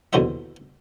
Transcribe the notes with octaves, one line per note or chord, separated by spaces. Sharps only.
D#2 B2 D3 E4 C5 E5